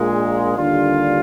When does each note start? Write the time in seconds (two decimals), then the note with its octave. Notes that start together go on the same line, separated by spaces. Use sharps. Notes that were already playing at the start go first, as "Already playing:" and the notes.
Already playing: A#1 A#2 G#3
0.57 D#2 D3 G3 D4 F4